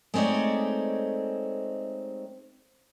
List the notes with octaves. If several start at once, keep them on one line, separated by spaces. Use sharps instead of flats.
G#3 A3 C4 D#4 C#5 D5